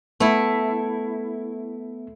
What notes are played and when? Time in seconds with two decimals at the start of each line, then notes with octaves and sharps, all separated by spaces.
0.20 A3 B3 E4